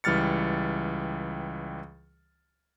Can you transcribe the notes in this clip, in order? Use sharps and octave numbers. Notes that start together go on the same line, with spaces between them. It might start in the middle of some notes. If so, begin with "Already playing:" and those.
C#2 E3 G3 F6 A6 C#7